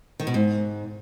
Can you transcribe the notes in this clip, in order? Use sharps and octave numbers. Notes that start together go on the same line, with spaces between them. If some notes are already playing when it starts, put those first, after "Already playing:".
D#3
B2
G#2